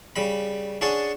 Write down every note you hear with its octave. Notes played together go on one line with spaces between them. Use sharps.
C#3 G3 B5
C#4 D4 G#4 F#5 A5 C#6